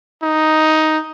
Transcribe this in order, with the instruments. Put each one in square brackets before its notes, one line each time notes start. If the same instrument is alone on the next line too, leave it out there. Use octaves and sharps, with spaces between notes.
[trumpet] D#4